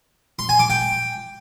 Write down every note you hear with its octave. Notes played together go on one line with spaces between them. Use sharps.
C6
G#5
D6
G5